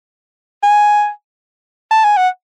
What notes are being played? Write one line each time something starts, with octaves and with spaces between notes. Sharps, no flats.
G#5
A5
G#5
F#5